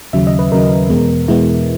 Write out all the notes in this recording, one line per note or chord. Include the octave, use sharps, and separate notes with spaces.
D#2 C#3 F#3 E5
D#5
B4
D#2 C#3 F#3 A#4
E2 B2 G#3 B3
E2 B2 G#3 B3 E4